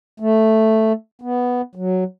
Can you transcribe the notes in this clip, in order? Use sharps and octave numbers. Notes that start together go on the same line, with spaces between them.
A3
B3
F#3